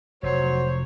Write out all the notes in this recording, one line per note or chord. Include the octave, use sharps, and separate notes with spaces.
F1 F#3 C5 C#5